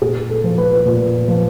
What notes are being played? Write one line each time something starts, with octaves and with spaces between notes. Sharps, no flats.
A#2 G#4
A4
F3
B4
A#2
F3